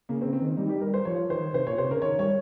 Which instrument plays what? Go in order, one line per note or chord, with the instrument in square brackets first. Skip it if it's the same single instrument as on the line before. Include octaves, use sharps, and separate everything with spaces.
[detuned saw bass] C#3 [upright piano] A#3
[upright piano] C4
[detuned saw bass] C#3
[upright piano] C4
[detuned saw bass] D#3
[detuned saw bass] G3 [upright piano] D#4
[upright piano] G4
A#4
C5
[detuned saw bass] F3 [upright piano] C#5
[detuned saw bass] D#3 [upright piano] C5
[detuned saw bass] C3 [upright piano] C5
[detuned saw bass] A#2 [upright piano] C#5
[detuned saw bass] C3 [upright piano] C5
[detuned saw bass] C#3 [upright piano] A#4
[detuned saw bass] D#3 [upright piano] C#5
[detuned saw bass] G3 [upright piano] C#5